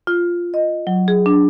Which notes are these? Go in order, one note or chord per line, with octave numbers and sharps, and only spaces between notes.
F4
D#5
F#3
G#4
D4